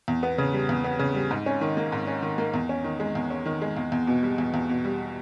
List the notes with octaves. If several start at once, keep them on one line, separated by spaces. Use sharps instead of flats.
E2
B3
C#3
G3
E2
B3
C#3
G3
G#2
C#4
D#3
A#3
G#2
C#4
D#3
A#3
E2
C#4
D#3
G#3
E2
C#4
D#3
G#3
E2
E2
B2
G3
E2
E2
B2
G3